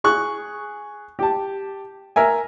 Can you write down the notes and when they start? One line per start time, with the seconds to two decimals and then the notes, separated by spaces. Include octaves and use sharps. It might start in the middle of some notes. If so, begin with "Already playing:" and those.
0.04 G#4 C#6 F#6
1.19 G4 A5
2.16 A#4 E5 G#5